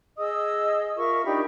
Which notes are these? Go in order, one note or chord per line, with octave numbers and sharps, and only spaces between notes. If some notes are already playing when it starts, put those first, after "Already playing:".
G#4 D#5 D#6 E6
F4 A#4 E5 C#6
D4 D#4 G4 B5